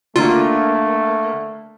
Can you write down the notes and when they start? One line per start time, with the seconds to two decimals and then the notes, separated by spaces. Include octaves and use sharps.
0.16 D3 A3 A#3 F4